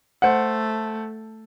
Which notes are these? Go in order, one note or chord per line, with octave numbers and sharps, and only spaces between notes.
A3 C5 F#5